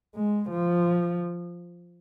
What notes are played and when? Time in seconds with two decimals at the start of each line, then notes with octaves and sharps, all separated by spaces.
0.15 G#3
0.51 F3